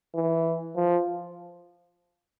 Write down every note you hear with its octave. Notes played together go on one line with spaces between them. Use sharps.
E3
F3